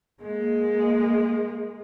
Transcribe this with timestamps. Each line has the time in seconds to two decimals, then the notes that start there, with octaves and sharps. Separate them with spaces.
0.21 G#3 A#3